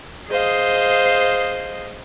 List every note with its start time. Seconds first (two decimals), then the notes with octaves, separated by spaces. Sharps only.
0.29 G#4 C5 D#5 F5